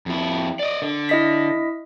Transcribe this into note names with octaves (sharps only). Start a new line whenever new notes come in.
F2 E4
D5 D#5
D3
E4 D#5 B6